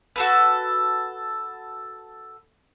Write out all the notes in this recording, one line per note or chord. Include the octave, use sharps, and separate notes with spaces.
F#4 A4 B4